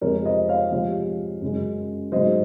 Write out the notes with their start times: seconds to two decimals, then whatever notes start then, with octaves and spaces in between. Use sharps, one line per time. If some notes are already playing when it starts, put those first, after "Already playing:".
0.01 F2 C3 F3 G#3 A#4 C#5
0.25 C5 D#5
0.49 C#5 F5
0.71 C3 F3 G#3 C#5 F5
1.41 F#2 C#3 G#3
2.12 G#2 F#3 C5 D#5